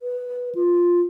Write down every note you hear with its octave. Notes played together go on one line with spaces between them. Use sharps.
B4
F4